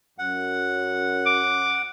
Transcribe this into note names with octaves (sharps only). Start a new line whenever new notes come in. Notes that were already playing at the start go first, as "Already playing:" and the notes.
F#2 F#5
D6